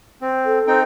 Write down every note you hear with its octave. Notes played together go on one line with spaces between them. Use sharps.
C4
A4
C4 D#4 G5